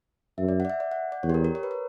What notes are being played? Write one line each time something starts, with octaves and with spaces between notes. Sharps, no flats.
F#2 E5
D5
F#5
D5
E5
D5
F#5
D5
E2 C#5
G4
A#4
A#4
C#5
B4
A#4